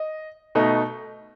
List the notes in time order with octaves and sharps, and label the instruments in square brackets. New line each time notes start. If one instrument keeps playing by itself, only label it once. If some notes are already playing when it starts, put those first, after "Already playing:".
Already playing: [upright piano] D#5
B2 A3 D#4